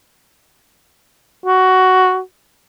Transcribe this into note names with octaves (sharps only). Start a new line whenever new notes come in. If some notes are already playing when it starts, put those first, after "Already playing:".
F#4